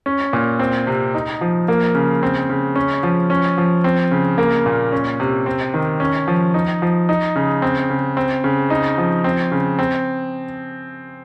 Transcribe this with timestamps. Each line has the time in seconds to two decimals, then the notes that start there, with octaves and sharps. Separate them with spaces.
0.06 C#4
0.33 A#2
0.59 C4
0.87 C3
1.14 D#4
1.41 F3
1.68 A#3
1.95 C#3
2.23 C4
2.50 C#3
2.76 C#4
3.03 F3
3.30 C#4
3.58 F3
3.84 C4
4.11 C#3
4.38 A#3
4.66 A#2
4.92 C#4
5.20 C3
5.46 C4
5.74 D#3
6.00 C#4
6.28 F3
6.54 D#4
6.82 F3
7.09 D#4
7.36 C#3
7.62 C4
7.90 C#3
8.17 C4
8.44 C#3
8.70 D#4
8.98 F3
9.24 C4
9.52 C#3
9.79 C4